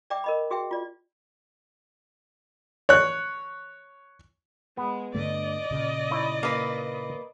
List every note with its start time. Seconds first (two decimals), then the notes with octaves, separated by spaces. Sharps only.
0.10 D5 E5 G5 D6
0.24 A#4 D#5 B5
0.50 F#4 G#4 E5 G5
0.71 F4 D5
2.89 C#5 F#6
4.77 G#3 B3
5.15 G2 D3 A3 D5 D#5
5.71 A#2 C#3
6.11 D#4 E4 C#5
6.43 A#3 B4